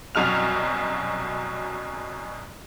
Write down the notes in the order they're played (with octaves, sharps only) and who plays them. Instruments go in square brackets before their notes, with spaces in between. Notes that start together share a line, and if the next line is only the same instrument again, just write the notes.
[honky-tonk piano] C2 F#2 B2 F6 F7